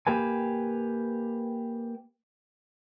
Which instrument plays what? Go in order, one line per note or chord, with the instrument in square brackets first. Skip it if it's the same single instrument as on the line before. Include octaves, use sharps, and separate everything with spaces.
[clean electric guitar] A#3 G4 B4 G#5